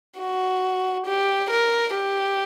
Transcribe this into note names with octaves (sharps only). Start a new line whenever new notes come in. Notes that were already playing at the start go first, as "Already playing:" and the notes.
F#4
G4
A#4
G4